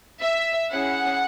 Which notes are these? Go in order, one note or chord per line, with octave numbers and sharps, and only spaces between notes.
E5
C#4 E4 G#4 F#5